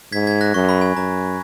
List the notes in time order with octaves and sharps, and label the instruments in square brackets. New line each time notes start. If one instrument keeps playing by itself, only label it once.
[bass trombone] G#2 [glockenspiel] G#6 B6
[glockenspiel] G#6 B6
F#6 A#6
[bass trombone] F#2 [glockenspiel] C#6
[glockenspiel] B5
G#5
[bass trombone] F#2 [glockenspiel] A#5